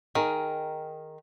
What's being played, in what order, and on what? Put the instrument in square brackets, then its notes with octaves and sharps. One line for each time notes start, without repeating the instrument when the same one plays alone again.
[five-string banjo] D#3 [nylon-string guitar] G#4 A#4